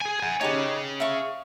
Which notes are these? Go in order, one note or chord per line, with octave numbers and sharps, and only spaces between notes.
G#4 G#5
F#5 G#5
D#4 G4 G#4 B4 C#5
E5 F5 C#6